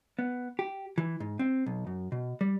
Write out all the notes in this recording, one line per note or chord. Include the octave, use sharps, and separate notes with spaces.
B3
G4
E3
G#2
C4
B1
F#2
B2
G3